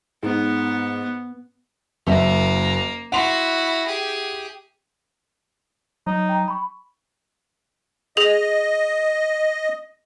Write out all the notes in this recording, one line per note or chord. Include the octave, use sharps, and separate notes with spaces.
G#2 B3
F#1 A#3 E5
E4 F#4 F#5 C6
G4 G#4
F#3 D#4
G5 A#5
B5 C#6
G#4 D#5 F#7